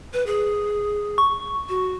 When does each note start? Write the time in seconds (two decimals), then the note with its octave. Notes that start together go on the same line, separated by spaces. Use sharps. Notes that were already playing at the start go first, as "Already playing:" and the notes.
0.13 B4
0.26 G#4
1.18 C#6
1.69 F#4